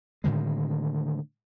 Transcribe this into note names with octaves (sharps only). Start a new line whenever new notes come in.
A2 D3 D#3 G#3